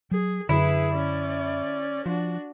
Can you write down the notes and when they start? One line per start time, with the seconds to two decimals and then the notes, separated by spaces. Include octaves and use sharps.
0.11 F#3 G#4
0.49 F#2 D3 E4 G#4 B4
0.95 C#4 D5
2.06 F3 D4 F#4